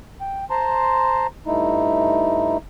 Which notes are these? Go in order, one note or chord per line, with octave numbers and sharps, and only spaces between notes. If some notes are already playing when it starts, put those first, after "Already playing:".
G5
C5 A5 A#5 C6
G2 A3 D#4 E4